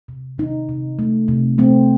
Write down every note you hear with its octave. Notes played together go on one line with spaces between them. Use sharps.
C3
C3 D#4
C3
A3
C3
A3 C4